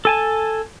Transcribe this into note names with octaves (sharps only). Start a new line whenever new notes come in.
A4 G#5 A5